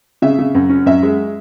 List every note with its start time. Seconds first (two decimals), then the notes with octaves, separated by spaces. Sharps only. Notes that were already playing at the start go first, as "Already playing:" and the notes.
0.22 C#3 E5
0.39 C#3
0.55 F#2
0.70 C#4
0.86 F#2 E5
1.03 G#3